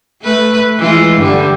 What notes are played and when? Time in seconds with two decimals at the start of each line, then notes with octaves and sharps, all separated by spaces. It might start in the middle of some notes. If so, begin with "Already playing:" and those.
0.22 A3 B4
0.79 E3 G#3 F4
1.16 G2 D3 G3